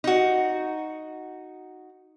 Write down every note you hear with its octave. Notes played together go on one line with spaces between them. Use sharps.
D#4 F#4